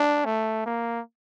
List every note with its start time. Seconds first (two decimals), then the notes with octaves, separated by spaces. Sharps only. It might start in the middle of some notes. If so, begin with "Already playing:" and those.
Already playing: D4
0.25 A3
0.66 A#3